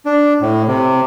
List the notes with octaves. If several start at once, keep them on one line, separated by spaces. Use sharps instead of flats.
D4
A2
C3